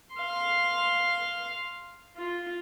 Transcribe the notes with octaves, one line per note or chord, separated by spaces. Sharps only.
F5 C6
F4